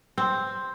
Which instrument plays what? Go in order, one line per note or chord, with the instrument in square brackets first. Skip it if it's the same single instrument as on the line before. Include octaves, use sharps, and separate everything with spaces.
[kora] C4